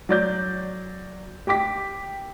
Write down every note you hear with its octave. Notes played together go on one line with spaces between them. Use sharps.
F#3 D5 G6
G4 G5 D6 B6